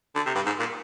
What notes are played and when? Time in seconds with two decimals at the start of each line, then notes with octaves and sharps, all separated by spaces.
0.16 D3
0.26 C3
0.35 G2
0.45 G#2
0.59 A#2